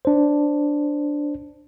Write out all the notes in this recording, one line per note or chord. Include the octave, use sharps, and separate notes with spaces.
D4 C5